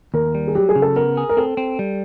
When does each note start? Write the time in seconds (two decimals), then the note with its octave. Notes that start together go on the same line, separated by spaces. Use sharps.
0.14 D#2 A#4
0.35 G3
0.48 G#4
0.55 F#3 G4
0.69 G#4
0.76 C#3
0.82 A4
0.96 B3 A#4
1.17 G#4
1.29 A#4
1.37 C4 A4
1.57 C4
1.79 G3